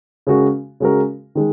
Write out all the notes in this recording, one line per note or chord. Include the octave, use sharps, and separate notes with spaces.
C#3 G#3 F#4 A#4
C#3 G#3 F#4 A#4
D#3 G#3